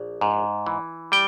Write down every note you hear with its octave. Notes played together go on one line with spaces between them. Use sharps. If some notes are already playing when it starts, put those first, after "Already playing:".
Already playing: A#1
G#2
E3
G3 G5